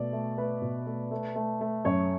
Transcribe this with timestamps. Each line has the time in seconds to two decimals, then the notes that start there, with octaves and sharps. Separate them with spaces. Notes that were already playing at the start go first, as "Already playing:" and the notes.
Already playing: B2 A3 D5 E5
0.13 A3
0.38 A3 B4
0.61 B2
0.87 A3
1.11 A3
1.36 A3
1.61 A3
1.85 F#2 C#5